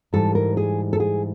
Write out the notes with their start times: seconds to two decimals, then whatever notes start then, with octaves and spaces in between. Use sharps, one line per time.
0.13 G#2 E3 G3 A4
0.35 A#4
0.57 G#4
0.93 A4
1.00 G#4